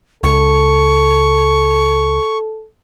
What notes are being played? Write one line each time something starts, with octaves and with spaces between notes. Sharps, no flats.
C#2 A4 C#6